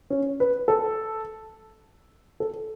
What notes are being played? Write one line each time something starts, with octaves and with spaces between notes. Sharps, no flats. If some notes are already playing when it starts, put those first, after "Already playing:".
C#4
B4
A4
A4